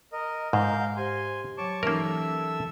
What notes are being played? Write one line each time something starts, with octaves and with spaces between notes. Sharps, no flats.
A#4 D#5
G#2 A#4 F5 G6
G4 C5 G#5 C6
F#3 C#5 A5 C#6 D6
E3 A#3 C#4 D#4 A4 A#4 E5 E6